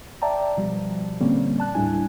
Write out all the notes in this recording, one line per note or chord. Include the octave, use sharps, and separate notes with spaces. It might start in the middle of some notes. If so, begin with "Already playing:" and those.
D5 E5 G5 A5 A#5
B2 F3 G3
A#2 D3 G3 A#3 C4 C#4
D5 A5 F#6
D#2 A2 G3 D4 E4 G#5